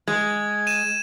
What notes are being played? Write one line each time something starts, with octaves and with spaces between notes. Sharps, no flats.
G#3 G#6
D#7 E7